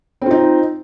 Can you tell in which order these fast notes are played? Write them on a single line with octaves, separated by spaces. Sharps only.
C4 F4 D#4